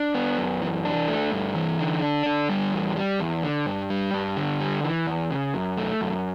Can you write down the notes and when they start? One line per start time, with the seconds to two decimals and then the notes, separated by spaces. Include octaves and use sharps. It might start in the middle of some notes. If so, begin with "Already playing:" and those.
Already playing: D4
0.15 B3
0.38 F#2
0.62 E3
0.85 D4
1.08 A3
1.32 G2
1.55 E3
1.79 D3
2.02 D4
2.26 D3
2.49 G3
2.73 E2
2.96 G3
3.20 E2
3.43 D3
3.66 G2
3.90 G3
4.14 G2
4.37 D3
4.60 G3
4.84 E3
5.07 E2
5.31 C#3
5.54 F#2
5.77 A3
6.01 F#2